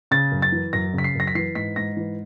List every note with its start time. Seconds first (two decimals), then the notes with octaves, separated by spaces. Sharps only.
0.11 C#3 A6
0.32 F#2
0.42 A6
0.52 E3
0.73 F#2 A#6
0.93 C#3 B6
1.04 C7
1.15 F#2 A#6
1.27 B6
1.35 E3 C7
1.55 G#2 B6
1.76 G#2 A#6
1.97 E3